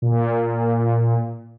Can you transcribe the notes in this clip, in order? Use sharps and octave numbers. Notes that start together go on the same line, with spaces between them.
A#2